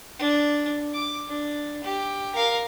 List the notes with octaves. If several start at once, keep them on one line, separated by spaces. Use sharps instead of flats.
D4
D6
D4
G4
A#4 F5